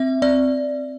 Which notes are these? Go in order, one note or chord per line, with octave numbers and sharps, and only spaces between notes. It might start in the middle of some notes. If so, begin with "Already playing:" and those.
Already playing: C4 E5
C4 D5